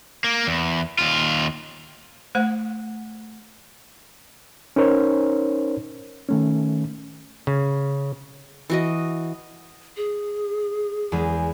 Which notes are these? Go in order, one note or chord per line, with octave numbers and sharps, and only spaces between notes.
A#3
E2
D#2 F4
A3 C5 F#5
C#4 D#4 A#4 C5 C#5
D#3 A3 C#4
C#3
E3 F#4 D#5
G#4
E2 G#3